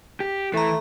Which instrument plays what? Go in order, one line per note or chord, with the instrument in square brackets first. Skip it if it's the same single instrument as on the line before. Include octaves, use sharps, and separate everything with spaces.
[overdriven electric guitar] G4
[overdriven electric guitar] E3 [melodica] A3 [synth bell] A4 A#5